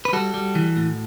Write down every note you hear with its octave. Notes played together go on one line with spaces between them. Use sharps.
B4
G3 F#4 A4
G3
E3
A2